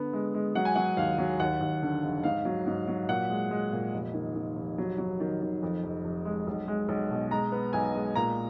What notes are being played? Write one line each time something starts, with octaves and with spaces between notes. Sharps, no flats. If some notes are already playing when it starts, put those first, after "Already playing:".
Already playing: D3 B3
G#3
G#3
F#3 F#5
G#5
F#3 F#5
D#2 F5
F#3
D#2 F#5
D#2
D3
F1
G#2 F5
F#3
G#2
F#3
A#2 F#5
G#3
G#3
A#2
F1
D#3
D#3
F1
F#3
F#3
D#3
D#3
F2
F1
F1
G#3
B1
G#3
B1
B2
G#3 A#5
B3
B1 G#5
G#3
A#2 A#5